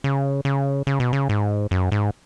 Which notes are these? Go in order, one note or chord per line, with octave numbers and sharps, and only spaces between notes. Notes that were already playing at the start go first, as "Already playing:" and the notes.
C#3
C#3
C#3
B2
C#3
G#2
F#2
G#2